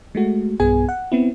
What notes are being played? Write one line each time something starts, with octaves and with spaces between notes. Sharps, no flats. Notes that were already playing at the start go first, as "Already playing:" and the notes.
G#3 A3 F#4
B1 G2 B3 G#4 G#5
F#5
B3 C4 E4